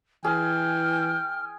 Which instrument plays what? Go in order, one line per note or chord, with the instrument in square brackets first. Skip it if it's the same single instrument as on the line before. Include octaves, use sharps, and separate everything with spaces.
[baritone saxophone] E3 [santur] G#4 [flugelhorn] G5 [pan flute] F6